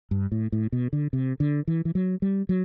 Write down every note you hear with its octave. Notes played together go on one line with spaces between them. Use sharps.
G2
A2
A2
B2
D3
C3
D3
E3
E3
F#3
G3
F#3